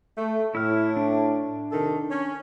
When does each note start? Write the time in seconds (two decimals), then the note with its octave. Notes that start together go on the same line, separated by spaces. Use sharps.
0.18 A3
0.55 A2 E4 F6
0.97 D4
1.72 C3 D#3 A4
2.11 C#4